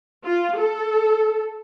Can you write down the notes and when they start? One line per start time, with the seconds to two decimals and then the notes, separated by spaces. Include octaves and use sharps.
0.24 F4
0.58 A4